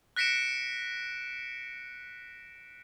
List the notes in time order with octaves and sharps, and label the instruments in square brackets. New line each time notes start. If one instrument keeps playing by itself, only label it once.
[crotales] F#6 A#6 B6 C#7 D7 E7